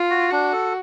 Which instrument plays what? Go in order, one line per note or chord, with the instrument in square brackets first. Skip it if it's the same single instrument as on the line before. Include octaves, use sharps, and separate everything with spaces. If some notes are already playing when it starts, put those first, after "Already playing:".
Already playing: [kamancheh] F4
[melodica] F#4
[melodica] D4 [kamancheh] F#4
[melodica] A4